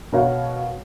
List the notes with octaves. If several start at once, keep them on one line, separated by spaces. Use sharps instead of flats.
B2 A#4 C#5 F5 F#5